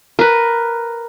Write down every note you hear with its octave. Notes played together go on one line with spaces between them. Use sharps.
A#4 B4